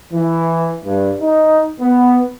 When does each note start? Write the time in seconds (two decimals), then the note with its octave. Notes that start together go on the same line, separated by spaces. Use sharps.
0.12 E3
0.85 G2
1.22 D#4
1.81 B3